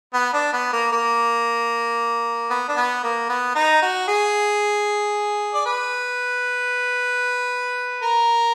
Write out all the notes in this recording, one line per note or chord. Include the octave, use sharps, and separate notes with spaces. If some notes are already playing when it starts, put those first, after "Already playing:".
B3
D4
B3
A#3
A#3
B3
D4
B3
A#3
B3
D#4
F#4
G#4
D5
B4
A#4